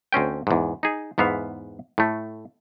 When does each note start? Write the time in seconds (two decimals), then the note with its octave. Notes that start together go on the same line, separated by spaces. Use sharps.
0.13 D2 C4 C#4 G5
0.47 E2 G#2
0.83 D#4 G#4
1.18 E2 G#2 B3 E5 F5
1.98 A2 A3